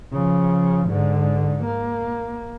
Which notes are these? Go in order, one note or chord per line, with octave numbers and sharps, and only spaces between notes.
C#3 F3
G#2 D3
A#3